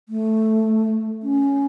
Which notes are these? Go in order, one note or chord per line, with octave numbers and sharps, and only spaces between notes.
A3
C#4